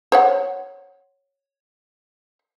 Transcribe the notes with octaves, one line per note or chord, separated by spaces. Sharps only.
C5 C#5 F#5